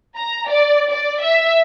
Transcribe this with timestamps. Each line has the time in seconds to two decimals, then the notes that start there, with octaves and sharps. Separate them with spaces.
0.16 A#5
0.49 D5
0.92 D5
1.22 E5